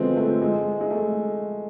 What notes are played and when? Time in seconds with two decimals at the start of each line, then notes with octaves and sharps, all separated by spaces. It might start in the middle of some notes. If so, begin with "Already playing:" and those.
Already playing: D3 F3 G#3 A3 B3 C4
0.17 A3
0.42 G#3
0.81 G#3
0.91 A3